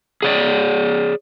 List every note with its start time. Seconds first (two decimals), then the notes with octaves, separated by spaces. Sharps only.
0.22 G#4 C#5 D5